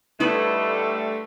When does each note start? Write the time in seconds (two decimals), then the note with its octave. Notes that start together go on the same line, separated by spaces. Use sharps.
0.20 D3 G3 A3 E4 B4 D#5